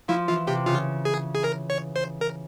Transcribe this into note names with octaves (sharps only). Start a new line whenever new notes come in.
F3 E4
E3 F4
C3 G4
C#3 F4
G#4
G#4
A#4
C#5
C5
A#4